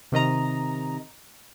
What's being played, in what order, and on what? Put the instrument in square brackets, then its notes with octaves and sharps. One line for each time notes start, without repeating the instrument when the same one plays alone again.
[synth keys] C3 D#3 D#5 A#5